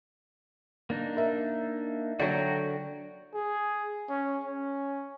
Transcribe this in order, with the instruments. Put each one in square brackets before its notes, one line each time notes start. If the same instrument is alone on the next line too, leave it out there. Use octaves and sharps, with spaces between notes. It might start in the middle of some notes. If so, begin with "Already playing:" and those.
[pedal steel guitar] A#3 D4 D#4
[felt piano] A#4 E5
[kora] D3 F#3 [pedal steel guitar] F#4 G5 A#5
[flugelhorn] G#4
C#4
C#4